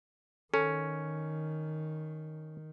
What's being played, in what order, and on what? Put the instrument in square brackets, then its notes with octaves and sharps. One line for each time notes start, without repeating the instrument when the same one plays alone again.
[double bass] D#3 [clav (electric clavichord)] C#4 [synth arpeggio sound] A4